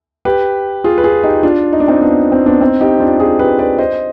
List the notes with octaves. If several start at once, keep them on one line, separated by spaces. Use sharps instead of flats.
G4 B4
F4 G#4
B4
F4 G#4
D#4 G4
D4 F4
D#4
D4
C4 D#4
B3 D4
C4
B3 D4
C4 D#4
D#4 G4
D4 F4
F4 G#4
G4 B4
B4 D5
C5 D#5